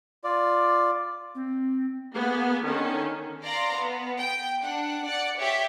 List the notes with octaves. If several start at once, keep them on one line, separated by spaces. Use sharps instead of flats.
F4 D5
C4
A#3 B3 G#4
D3 D#3 C#4
D5 F5 A#5 C6
B3
G5
D4 F#5
D5 F#5 C#7
G4 C#5 E5